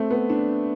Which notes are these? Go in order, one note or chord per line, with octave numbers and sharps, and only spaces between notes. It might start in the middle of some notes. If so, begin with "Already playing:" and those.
Already playing: A3 C4
B3
D4